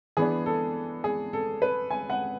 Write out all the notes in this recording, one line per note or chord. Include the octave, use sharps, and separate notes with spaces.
E3 B3 D4 G#4
A4
G#4
A4
B4
G#5
F#5